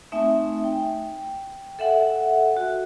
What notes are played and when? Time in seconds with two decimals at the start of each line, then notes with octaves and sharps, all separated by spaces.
0.12 A3 C4 D#4 E5 G#5
0.64 G5
1.79 A4 E5 F#5 G#5
2.57 F#4